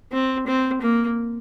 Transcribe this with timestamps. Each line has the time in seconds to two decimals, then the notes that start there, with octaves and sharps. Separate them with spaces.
0.12 C4
0.47 C4
0.82 A#3